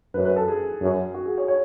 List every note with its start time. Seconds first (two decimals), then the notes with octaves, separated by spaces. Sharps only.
0.14 F#2 B4
0.25 B4
0.36 A4
0.48 G#4
0.81 F#2
1.14 F#4
1.26 G#4
1.38 C#5
1.48 C#5